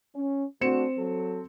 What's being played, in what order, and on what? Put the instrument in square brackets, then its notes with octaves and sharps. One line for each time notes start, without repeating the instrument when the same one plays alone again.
[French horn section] C#4
[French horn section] A3 D4 F#4 [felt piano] C4 C#7 E7
[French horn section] F#3 A4